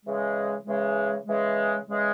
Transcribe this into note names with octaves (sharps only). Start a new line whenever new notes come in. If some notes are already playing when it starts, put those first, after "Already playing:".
C#3 E3 G#3
C#3 E3 G#3
C#3 E3 G#3
C#3 E3 G#3